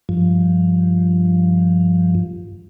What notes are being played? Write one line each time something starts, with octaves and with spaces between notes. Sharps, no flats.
G2 F3